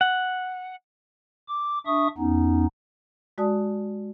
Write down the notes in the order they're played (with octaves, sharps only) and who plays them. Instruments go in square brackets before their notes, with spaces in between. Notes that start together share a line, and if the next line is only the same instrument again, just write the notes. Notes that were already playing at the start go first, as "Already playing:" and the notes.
[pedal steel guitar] F#5
[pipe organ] D6
D4 E5 C#6 D#6
E2 B3 C#4 D#4
[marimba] G#3 F#4 D5 A5 D#6